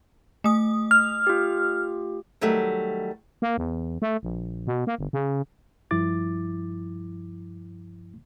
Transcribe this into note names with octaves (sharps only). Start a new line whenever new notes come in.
A3 D#6
F6
F4 G4
D#3 F#3 G3 A3
A#3
E2
A3
A#1
B2
A#3
G1
C#3
G2 F3 E4 D6 A6